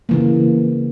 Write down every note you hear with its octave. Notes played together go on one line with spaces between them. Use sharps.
C#3 E3 A#3